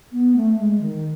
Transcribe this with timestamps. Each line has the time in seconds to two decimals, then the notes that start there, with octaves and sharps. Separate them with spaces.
0.12 B3
0.36 A3
0.58 G#3
0.81 D#3